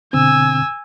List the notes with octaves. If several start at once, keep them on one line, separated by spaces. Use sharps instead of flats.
B2 D3 C4 G#5 E6